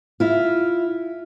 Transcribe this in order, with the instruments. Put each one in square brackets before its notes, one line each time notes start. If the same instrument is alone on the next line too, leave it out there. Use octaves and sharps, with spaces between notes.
[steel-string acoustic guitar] E4 F4